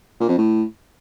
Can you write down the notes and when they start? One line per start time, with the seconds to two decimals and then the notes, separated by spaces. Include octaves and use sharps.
0.20 A#2
0.29 F2
0.38 A2